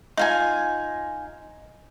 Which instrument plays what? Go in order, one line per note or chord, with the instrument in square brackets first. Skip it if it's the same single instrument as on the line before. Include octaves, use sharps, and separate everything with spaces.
[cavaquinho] D#4 F4 G#5